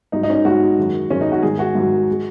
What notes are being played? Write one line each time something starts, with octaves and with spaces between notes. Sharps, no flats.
G#2 F#3 D#4
D#4
C#4
D#4
G#2 F#3 F#4
F#2 D#3 G#3
F#2 D#3 G#3 C#4
D#4
F#4
G#2 D#3 F#3 G#4
F#4
G#2 D#3 F#3
G#3